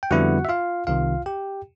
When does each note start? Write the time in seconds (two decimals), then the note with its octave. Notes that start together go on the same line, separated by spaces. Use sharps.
0.03 G5
0.11 F2 D3 G3 B3 E4 F#4 F#5
0.45 E5
0.49 F4 F5
0.87 C2 C3 D#3 F4 F5
1.26 G4 G5